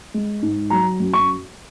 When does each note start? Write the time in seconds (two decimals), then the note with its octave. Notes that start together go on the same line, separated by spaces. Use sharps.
0.14 G#3
0.42 G#2
0.70 F#3 A#5
1.00 F#2
1.13 C#6